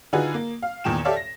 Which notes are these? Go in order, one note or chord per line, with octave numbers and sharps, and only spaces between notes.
D3 D#4 F4 F#4 G#4 B4
A#3
F5
E2 A#2 D#3 G5 E7
G4 A4 C#5 D5 E5 F5
A#6